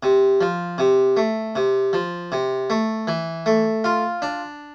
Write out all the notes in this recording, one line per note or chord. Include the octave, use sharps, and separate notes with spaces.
C3
F3
C3
A3
C3
F3
C3
A3
E3
A3
F4
D4